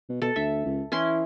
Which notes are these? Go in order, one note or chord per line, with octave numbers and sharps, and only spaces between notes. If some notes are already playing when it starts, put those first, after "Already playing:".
B2
B2 A4
D2 E5
C#2
E3 C#4 E4 C6